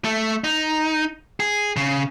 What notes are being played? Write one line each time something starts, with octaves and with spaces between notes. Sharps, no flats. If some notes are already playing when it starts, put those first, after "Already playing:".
A3
D#4
G#4
C#3